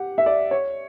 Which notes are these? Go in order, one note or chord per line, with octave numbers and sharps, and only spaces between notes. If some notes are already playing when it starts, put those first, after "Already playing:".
Already playing: G4 F#5
E5
D5
C#5